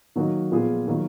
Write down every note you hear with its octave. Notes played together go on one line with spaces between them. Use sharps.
D#3 F#3 A#3 D#4 F#4
A#2 F3 B3 F4 G#4
D#3 F#3 A#3